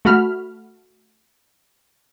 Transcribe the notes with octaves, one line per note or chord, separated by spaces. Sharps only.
A3 F#4 B5 F6